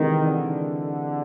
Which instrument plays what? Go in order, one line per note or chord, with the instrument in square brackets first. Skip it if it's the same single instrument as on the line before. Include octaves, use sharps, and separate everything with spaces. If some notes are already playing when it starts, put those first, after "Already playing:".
Already playing: [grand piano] C3 E3 G#3 [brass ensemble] D#3
[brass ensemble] D3